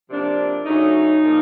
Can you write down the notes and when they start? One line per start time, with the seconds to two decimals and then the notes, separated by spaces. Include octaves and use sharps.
0.09 C3 F3 A#3 D4
0.65 C#3 F#3 A3 C#4 D#4
1.21 A#2 F3 A#3